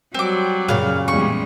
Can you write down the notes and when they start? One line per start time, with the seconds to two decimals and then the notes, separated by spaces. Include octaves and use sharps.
0.14 F#3 G3 C4 D6
0.69 F#2 A#2 C#3 F5
1.08 E2 G3 G#3 C#6